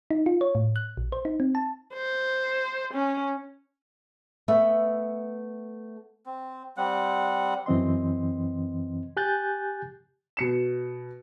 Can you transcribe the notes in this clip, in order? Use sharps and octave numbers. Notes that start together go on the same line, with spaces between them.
D#4
F4
C#5
A2
F#6
A#1
C5
D#4
C4
A5
C5
C#4
A3 B3 E5
C4
G3 C4 F#5
F#2 E3 C4 D#5 C6
G4 G#5 F#6 G6 A6
B2 C#7 E7